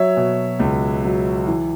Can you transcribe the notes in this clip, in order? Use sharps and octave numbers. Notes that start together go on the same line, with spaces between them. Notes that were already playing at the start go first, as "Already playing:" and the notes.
Already playing: F#3 C#5 E5
B2
C#2
F#3
E3